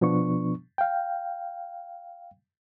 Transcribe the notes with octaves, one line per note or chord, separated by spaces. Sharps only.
B2 F3 B3 D4 C#6
F5 G5